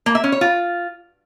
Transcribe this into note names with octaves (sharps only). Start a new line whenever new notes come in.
A#3
E5
C#4
C#5
F4